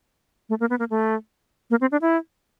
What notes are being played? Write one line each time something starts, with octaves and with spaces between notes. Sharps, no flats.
A3
A#3
B3
A#3
A3
A#3
C4
D4
E4